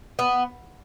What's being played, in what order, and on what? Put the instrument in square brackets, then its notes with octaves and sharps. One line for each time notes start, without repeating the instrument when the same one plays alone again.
[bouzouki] B3